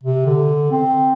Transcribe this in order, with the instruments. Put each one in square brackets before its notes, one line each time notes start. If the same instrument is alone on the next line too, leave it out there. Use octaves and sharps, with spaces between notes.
[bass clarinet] C3
D3
C4